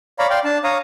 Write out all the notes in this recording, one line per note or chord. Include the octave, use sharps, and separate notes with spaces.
C#5 D5 F5 A#5 B5
D5 F5 G5 C6
D4 A5
C#5 F5 A#5 D#6